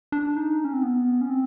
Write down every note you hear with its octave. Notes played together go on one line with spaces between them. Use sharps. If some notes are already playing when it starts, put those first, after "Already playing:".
D4
D#4
C#4
C4
B3
C#4
C4